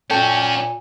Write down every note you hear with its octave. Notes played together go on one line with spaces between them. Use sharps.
A#2 C#4 F#4 A4 D5 G5